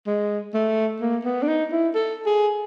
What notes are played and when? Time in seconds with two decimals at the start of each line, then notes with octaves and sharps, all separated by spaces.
0.07 G#3
0.54 A3
1.01 A#3
1.24 B3
1.42 D4
1.48 D#4
1.72 E4
1.95 A4
2.26 G#4